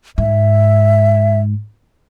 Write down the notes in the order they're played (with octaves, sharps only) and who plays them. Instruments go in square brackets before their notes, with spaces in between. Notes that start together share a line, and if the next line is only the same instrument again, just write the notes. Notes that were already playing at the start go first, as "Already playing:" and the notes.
[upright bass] G#2 [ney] E5